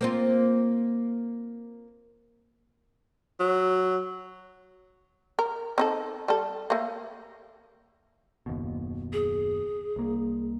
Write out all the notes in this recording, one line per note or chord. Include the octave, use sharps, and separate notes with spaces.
A#3 C4 F4
F#3
A#4
C4 D#4 A4
G3 A4
A3 A#3
F#1 D#2 B2
G#4
C2 A#3